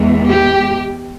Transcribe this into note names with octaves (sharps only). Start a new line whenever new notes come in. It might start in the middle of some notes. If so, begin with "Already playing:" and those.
Already playing: E2 E3 G#3
G4